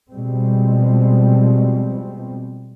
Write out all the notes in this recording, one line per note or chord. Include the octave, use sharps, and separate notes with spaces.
B2 F3 G3 G#3 C4